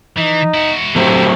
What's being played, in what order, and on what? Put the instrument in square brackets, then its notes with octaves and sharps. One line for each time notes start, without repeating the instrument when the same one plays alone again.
[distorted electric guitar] E3 [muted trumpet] D#4
[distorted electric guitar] E4 F#4
[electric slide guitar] F#3 A3 C4 [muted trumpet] G4